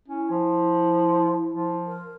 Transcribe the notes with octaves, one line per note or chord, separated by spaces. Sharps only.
C#4 E4
F3
F3
A#4